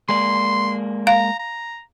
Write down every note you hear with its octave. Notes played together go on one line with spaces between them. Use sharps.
G#3 A#3 D5 C6
F5 A#5
A#5